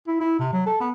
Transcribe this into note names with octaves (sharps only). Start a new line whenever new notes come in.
E4
E4
C3
F#3
A4
B3